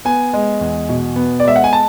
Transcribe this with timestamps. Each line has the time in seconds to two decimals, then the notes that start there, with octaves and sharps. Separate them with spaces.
0.05 B3 G#5
0.33 G#3
0.61 E2
0.89 B2
1.16 B3
1.40 D5
1.45 G#3 E5
1.56 F#5
1.64 G#5
1.73 A5